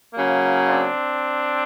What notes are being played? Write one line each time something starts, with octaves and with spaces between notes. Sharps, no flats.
C#3 F#3 A#3
C4 D4